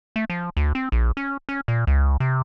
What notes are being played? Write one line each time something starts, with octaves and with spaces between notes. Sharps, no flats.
A3
F3
D2
C4
A#1
C#4
C#4
A#2
C#2
C3